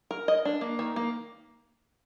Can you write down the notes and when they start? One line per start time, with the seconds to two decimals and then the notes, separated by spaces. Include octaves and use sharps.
0.11 A#4
0.28 D#5
0.45 D4
0.61 A#3
0.79 D#3
0.96 A#3